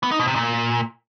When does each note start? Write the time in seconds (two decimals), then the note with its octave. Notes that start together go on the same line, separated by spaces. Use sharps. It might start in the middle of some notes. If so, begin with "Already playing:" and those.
0.03 B3
0.11 D#4
0.19 B2
0.27 C3
0.35 A#2